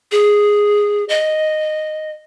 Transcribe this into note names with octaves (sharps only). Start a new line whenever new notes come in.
G#4
D#5